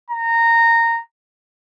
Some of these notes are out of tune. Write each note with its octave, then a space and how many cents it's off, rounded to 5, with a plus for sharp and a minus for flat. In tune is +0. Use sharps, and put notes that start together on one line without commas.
A#5 -15